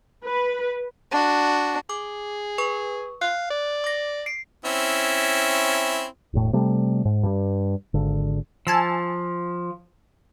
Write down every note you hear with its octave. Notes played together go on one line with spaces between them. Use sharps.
B4
D4 F#4
G#4 D6
B4 C#6
F5 F#6
D5
D6 A#6
C7 D7
C4 C#4 E4
E1 A2
C3 G3 A3
G#2
G2 G3
G#1 D3
F3 G#5 A5 E6